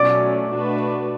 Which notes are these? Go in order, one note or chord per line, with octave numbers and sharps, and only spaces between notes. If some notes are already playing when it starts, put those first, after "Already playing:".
Already playing: B2 F#3 A3 C#4 D5 D6
B2 A3 D4 F#4 B4